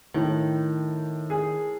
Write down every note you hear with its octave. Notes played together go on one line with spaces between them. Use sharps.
A2 D#3
G#4